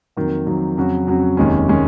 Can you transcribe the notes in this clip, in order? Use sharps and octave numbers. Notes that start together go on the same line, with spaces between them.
F2 D#3 F#3 A#3
F2 D#3 F#3 A#3
F2 C#3 F#3 C#4 F#4
F2 C#3 F#3 C#4 F#4
F1 D#2 D#3 G#3 C#4
D#3 G#3 C#4